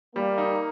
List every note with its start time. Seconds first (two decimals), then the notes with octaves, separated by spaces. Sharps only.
0.16 G3 A#3
0.38 D#4